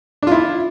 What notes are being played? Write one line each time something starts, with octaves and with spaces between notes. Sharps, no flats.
D4 E4 F4